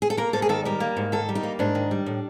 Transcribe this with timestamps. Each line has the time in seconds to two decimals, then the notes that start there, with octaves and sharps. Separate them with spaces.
0.02 G#4
0.10 A4
0.17 A#3 A#4
0.33 G#2 A4
0.42 G#4
0.49 D#3 A4
0.65 G3 A#4
0.80 A#3
0.97 G#2
1.12 D#3 A4
1.29 G3
1.35 D#4
1.43 A#3
1.59 G#2 D4
1.75 D#3
1.91 G3
2.06 A2